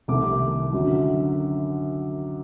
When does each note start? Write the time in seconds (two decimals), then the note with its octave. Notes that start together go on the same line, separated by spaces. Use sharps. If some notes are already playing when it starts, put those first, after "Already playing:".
0.08 C2 C3 D#3 A3 D6
0.73 F#2 D3 F#3